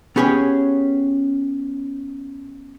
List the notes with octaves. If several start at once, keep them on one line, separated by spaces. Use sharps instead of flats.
B3 C#4 G4 G#4 C#5